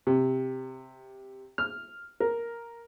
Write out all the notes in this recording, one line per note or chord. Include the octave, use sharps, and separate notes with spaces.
C3
F6
A#4